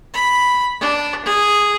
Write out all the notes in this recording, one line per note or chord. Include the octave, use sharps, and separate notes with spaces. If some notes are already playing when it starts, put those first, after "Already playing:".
B5
D4
G#4